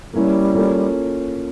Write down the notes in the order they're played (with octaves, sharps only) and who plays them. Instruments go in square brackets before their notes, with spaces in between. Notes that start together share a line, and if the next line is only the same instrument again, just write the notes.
[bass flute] G3 [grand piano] A#3 C#4 E4
[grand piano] A#3 C#4 F4 A4